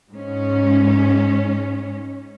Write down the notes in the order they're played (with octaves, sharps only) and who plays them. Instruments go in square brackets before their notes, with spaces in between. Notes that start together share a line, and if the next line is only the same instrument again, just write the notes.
[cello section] G#2 C#4